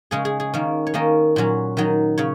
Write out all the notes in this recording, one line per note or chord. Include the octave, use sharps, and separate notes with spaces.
C#3 G#3 C#4 G#4
G#4
G#4
D#3 A#3 C#4
C#5
D#3 A#3 C#4 D#5
A#2 F#3 C#4
D#3 F#3 D#4
C#3 C#5